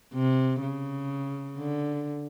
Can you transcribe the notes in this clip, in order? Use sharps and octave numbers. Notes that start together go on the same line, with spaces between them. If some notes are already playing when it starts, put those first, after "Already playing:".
C3
C#3
D3